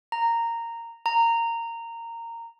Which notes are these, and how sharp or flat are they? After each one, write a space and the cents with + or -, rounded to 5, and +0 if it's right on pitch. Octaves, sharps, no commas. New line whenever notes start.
A#5 -10
A#5 -15